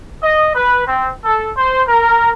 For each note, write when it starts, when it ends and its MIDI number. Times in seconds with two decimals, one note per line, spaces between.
0.22 0.52 75
0.54 0.83 71
0.87 1.10 60
1.24 1.51 69
1.57 1.82 72
1.87 2.31 70